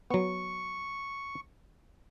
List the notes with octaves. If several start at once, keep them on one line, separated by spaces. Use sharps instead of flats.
F#3 B3 C#6